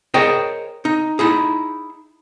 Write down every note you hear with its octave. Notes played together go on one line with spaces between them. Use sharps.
G#4 A#4 C5 C#5 D#5 G5
D#4
D#4 E4 G#4